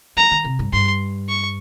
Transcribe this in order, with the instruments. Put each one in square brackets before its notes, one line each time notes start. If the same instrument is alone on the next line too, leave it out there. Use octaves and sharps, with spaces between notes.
[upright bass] F3 [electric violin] A#5
[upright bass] D#3
C3
G2
[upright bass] G2 [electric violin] C6
[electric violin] C#6